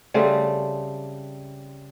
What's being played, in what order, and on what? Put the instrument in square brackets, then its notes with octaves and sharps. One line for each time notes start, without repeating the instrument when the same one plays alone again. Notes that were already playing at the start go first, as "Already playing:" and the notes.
[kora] C#3 G3 A3 C4